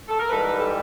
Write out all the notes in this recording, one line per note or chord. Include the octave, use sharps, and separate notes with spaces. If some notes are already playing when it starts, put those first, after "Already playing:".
A4
A#4
G#2 E3 G3 A4 B4
G4 A4